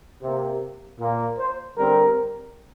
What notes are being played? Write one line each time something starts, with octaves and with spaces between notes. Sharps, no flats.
C3 A#3
A#2 A#3
C5
D3 G3 C4 A#4